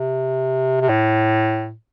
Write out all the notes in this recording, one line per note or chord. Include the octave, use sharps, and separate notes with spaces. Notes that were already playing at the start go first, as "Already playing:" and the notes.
Already playing: C3
C3
A2